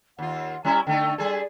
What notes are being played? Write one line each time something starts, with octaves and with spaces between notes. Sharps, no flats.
D#2 F4 F#5
G3 C#4 E4 A#5
D3 A3 D#4 G5
G3 G#4 A4 D5